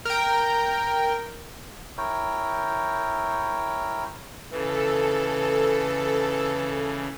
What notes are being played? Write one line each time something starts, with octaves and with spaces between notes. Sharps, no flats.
A#4 G5
E4 A#4 C#5 G5
C#3 E3 A4 B4